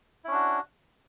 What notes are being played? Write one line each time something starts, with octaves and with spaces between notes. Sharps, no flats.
C#4 D4 E4 F#4